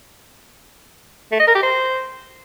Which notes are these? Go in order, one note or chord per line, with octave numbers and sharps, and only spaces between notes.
A3
D#5
A#4
G4
C5